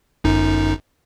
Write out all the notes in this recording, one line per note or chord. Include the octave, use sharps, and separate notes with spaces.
G1 F#2 D#4